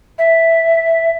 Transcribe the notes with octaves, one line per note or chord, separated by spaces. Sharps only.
E5